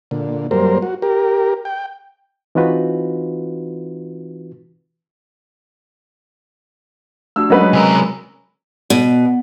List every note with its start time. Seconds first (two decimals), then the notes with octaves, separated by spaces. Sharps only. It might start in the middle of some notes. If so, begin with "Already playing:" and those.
0.11 A#2 D3
0.51 F#2 G3 A#3 A#4 C5
0.82 F#4
1.02 G4 A#4
1.65 G5
2.55 E3 C4 D#4 F4 F#4 B4
7.36 A3 D4 F#4 E6
7.50 F#3 G#3 C#4 B4 D#5 F#5 B5
7.73 C3 A#4 G#5 E6
8.90 B2